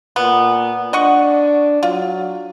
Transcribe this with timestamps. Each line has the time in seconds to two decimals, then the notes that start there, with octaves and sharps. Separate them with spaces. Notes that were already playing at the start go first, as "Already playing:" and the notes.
0.16 A#2 B3
0.93 D4 D#5 F#5 C#6
1.83 F#3 F4